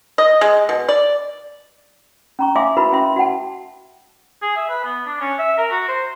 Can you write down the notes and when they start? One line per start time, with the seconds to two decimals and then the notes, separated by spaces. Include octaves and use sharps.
0.18 D#5
0.41 G#3
0.69 B2
0.89 D5
2.39 C#4 A#5 C#6
2.56 E5 F5 G#5 C6 D6 D#6
2.77 E4 F#4 A#4 B4 E5 B5
2.92 C#4 F#4 E5 C6
3.16 F#4 F#5 G5 A5
4.42 G#4
4.56 E5
4.70 B4
4.85 B3
5.06 D4
5.21 C#4
5.39 E5
5.58 A#4
5.71 F#4
5.88 C5